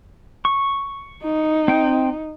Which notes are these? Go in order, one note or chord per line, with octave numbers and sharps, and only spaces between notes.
C#6
D#4
C4 G5